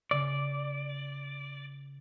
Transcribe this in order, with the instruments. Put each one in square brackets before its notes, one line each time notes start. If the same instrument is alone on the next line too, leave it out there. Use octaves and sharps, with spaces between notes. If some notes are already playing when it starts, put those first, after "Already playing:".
[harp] C#3 A#6 [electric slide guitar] D5